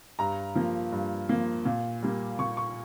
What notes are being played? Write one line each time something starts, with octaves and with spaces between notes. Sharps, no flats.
G2 A#5
F3 A#3
G2
F3 A#3
A#2
G3 A#3
A#2 C#6
C#6